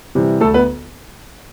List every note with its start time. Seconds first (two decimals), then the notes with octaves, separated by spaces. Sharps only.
0.15 C3 E3 G3
0.41 D2 A3 A4
0.54 B3 B4